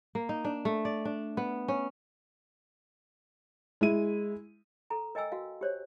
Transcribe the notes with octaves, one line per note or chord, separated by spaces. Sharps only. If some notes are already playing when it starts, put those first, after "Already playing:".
A#3
D#4
D4
A3
D5
D4
B3
C#4
G#3 E4 D#7
A4 A#5
A#4 D#5 G5 G#5 E6
F#4 F5
G4 C5 C#5